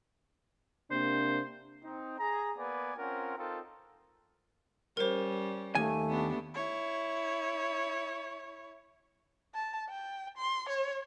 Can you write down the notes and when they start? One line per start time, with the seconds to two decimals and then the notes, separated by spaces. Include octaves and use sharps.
0.91 C3 A#3 D4 C5
1.84 C4 D#4
2.19 G#4 A#5
2.58 A#3 B3 B4 D5 G#5
2.97 C4 C#4 F4 A#4 F#5
3.37 C4 D#4 F4 A4 A#4
4.97 G3 C#4 A#4 C5
5.75 D#2 A3 G#5
6.10 B3 D4 G4
6.54 E4 C#5
9.54 A5
9.89 G5
10.37 C6
10.69 C#5